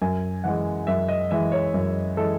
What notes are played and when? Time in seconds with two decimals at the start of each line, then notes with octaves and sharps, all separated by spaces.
0.02 F#2 G#5
0.44 E3 G#3 F#5
0.87 F#2 E5
1.08 D#5
1.31 E3 G#3 E5
1.52 C#5
1.74 F#2
2.17 E3 G#3 A4